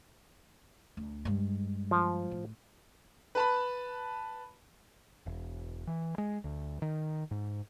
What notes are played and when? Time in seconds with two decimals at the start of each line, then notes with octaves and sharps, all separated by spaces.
0.97 D2
1.25 G2 G#3
1.91 F3
2.31 A2
3.35 B4 A5 B5
5.26 E1
5.87 E3
6.18 G#3
6.44 D2
6.82 D#3
7.31 G#2